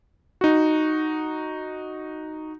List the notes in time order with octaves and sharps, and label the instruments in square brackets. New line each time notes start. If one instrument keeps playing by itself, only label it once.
[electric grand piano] D#4 F#4